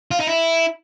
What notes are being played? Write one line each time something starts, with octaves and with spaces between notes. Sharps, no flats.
F4
D#4
E4